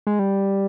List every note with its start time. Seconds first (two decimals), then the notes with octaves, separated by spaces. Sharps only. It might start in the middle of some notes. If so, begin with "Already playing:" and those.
0.07 G#3
0.19 G3